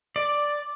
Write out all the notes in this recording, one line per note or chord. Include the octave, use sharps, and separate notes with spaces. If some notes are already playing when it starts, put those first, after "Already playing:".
D5